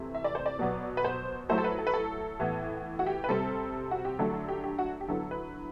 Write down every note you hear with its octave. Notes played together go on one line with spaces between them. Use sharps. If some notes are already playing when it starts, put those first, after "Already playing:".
Already playing: C3 E3 A3
E5
D5
C5
D5
B2 F#3 B3
B4
C5
F#3 A3 E4 C5
A4
B4
A4
B4
A4
A2 E3 B3
F#4
G4
B4
C3 G3 C4 A4
F#4
G4
D3 F#3 A3 D4 A4
A4
G4
G4
F#4
G4
D3 F#3 B3 E4 A4
B4